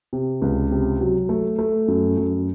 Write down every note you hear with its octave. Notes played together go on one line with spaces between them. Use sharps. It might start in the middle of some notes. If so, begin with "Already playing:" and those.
C3
C#2
C3
F#3
A3
A3
F#2
F#2